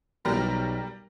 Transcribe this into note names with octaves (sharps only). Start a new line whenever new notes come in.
B1 G3 A#4